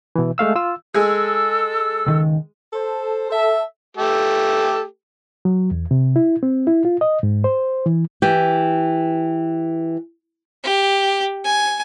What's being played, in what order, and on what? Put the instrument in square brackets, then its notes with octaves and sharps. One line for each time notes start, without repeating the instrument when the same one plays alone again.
[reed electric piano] B2 E3
G#3 A3 F5 E6
F4 E6
[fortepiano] G#3 G#4 [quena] A4 [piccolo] E6
[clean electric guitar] C#2 D#3
[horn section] A4 C5
A4 E5
[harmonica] A3 G4 A4
[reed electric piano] F#3
E2
C3
E4
C4
E4
F4
D#5
G#2
C5
E3
[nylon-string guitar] E3 G4
[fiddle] G4
G#5